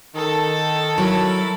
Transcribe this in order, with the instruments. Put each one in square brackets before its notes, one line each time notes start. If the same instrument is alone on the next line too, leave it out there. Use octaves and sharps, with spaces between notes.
[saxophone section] D#3 [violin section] A4
[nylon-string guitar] F#3 [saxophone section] E4 A#4